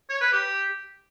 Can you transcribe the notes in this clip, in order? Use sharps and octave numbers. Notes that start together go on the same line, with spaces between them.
C#5
B4
G4